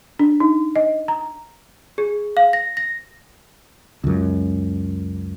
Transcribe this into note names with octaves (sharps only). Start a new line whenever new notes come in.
D4
D#4
D#5
A#5
G#4
F5
A#6
A#6
C#2 F#2